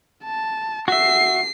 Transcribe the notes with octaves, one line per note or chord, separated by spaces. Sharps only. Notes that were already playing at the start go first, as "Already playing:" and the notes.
A5
F#4 E5 C7